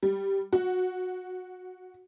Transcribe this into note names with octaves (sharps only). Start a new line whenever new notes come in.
G3
F#4